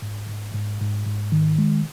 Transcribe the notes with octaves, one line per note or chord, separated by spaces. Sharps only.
G#2
G#2
G#2
G#2
G#2
D#3
G#3